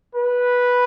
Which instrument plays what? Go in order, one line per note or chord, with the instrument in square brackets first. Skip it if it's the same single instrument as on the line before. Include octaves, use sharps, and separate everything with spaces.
[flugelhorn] B4